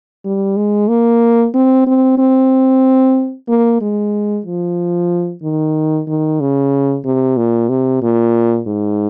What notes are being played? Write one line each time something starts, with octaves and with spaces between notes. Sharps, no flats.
G3
G#3
A#3
C4
C4
C4
A#3
G#3
F3
D#3
D#3
C#3
C3
A#2
C3
A#2
G#2